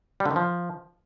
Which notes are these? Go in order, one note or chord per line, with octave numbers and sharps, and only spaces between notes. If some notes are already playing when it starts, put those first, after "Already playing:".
G3
D3
D#3
F3